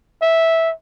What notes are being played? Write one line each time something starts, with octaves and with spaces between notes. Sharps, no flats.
E5